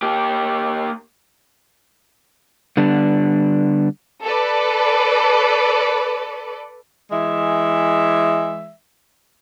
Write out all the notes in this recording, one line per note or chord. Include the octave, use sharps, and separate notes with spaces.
A#3 G4
D3 G3 B3 D4
A4 B4 D5
E3 G#3 E5